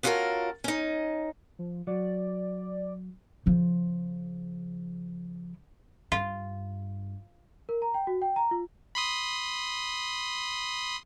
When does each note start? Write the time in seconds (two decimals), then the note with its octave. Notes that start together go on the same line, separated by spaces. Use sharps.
0.03 B3 C#4 F4 F#4 A4 A#4
0.64 C#4 D#4
1.59 F3
1.87 F#3 D5
3.46 C#3 F3
6.12 G2 F4
7.69 A#4
7.82 A#5
7.94 G5
8.07 F#4
8.22 G5
8.36 A#5
8.51 F4
8.95 B5 C6 D#6